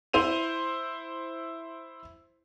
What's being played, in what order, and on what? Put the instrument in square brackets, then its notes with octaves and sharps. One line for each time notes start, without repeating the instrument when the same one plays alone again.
[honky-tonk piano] E4 C5 D#7 F7